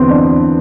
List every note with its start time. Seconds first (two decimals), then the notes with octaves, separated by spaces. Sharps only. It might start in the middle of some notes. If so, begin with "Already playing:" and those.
Already playing: E2 D3 B3 C4
0.10 D4